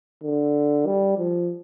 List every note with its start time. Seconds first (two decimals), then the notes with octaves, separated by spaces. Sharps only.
0.24 D3
0.87 G3
1.18 F3